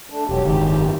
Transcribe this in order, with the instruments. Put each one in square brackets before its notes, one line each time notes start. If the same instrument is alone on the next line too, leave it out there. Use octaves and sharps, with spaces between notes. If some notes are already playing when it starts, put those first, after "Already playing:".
[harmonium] A3 D4
[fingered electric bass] E1 [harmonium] F#3 G4
[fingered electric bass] F#1 G#2 D#3 [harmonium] G4